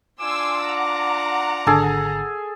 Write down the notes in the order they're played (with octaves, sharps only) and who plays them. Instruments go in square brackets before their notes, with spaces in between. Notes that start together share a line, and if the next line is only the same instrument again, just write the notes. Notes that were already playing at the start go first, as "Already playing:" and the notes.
[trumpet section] D4 F4 D6 [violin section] G#5 C6 E6
[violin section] F#5 A#5
[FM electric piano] G#1 D3 [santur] G#4 A4 G#5